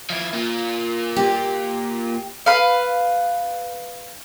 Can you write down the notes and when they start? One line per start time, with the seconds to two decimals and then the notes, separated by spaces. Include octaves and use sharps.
0.10 F3 E4
0.33 A#3 F4
1.16 G4
2.46 B4 F5